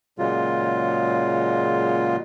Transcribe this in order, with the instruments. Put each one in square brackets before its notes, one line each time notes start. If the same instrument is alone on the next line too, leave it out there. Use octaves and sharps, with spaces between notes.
[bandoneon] A#2 C#3 F#3 G#3 F4